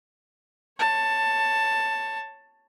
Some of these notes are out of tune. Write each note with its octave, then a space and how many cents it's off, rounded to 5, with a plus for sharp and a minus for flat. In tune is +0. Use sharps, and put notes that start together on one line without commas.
C#5 +0 A5 +10